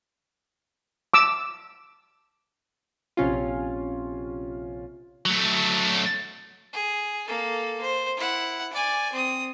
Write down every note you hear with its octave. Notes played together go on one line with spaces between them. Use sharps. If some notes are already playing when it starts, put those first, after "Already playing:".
D6 E6
A#1 C3 C#4 F4
F#3 A3
G#4
A#3 A4
C5
E4 F#5
D5 G#5
C4 D#6